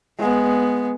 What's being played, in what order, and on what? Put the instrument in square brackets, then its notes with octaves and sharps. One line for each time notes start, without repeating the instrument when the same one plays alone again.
[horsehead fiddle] G#3 B3